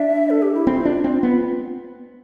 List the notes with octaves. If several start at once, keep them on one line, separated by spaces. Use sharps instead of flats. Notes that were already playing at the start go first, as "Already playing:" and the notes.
Already playing: D4 E5
A4
G4
E4
C4 F4
D4
C4
B3